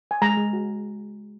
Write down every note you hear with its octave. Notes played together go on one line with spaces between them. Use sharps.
G#5
G#3 A#5
G#3
F#4